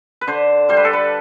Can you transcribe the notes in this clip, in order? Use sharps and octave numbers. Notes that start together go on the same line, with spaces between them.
B4
D3 C5
G3 C5
B4
A4
B4